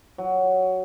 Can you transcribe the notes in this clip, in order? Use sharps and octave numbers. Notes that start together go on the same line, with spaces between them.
F#3